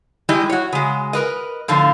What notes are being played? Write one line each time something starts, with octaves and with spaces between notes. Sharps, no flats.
G3 G#3 E4 G4 D#5
F#4 C#5
C#3 G#3
A#4 B4 D#5
A2 D3 F3 F4